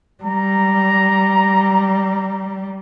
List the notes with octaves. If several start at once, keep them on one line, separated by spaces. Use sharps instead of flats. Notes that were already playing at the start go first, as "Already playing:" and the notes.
G3 A#5